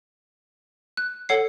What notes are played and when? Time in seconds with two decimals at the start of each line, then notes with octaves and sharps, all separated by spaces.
0.97 F#6
1.29 A4 C#5 F#5 C7